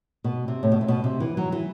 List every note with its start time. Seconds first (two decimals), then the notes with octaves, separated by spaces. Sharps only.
0.24 B2
0.48 C3
0.63 A2
0.72 B2
0.81 C3
0.88 B2
1.04 C3
1.20 E3
1.37 F#3
1.52 E3